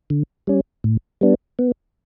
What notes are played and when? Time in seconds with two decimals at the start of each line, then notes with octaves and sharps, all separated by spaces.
0.10 D3
0.47 G3 C#4
0.84 A2
1.21 G3 B3 D4
1.59 B3